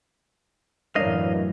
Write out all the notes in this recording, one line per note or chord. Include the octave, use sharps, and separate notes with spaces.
F#2 A2 E3 D4 A#4 C#5 D#5 F5